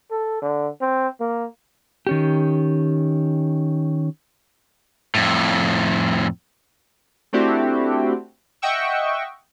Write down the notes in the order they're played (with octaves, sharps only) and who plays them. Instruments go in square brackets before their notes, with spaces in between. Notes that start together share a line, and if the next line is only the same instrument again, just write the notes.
[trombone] A4
D3
C4
A#3
[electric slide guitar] D#3 C#4 G4
[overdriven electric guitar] F2 A2
[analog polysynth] A3 C4 D4 E4 F#4 G4
D#5 E5 F#5 G5 C#6 E6